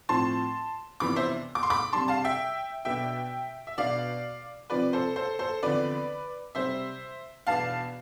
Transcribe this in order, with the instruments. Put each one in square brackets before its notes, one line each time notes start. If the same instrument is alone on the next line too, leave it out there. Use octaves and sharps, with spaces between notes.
[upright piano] A2 F3 C4 A5 C6
F2 C3 E3 B3 D4 B5 D6
C5 E5
D6
C6
B5 D6
C3 G3 D4 A5 C6
F5 A5
E5 G5
B2 B3 D4 E5 G5
E5
B2 B3 D4 D5 F5
C3 F3 C4 B4 D5
A4 C5
A4 C5
A4 C5
E2 D3 F3 C4 B4 D5
C3 G3 C4 C5 E5
E2 B2 B3 D4 F5 A5